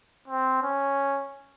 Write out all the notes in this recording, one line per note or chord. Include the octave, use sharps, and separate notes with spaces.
C4
C#4